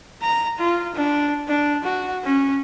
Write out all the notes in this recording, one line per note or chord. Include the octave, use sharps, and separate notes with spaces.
A#5
F4
D4
D4
F#4
C#4